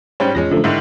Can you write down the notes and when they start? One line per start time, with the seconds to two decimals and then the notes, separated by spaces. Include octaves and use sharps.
0.20 G#2 G3 C#4 C5 G5 G6
0.35 E2 F3 G#3 C#4 A#6
0.51 F#2 D3 F3 A3
0.64 G#2 D3 D#3 E4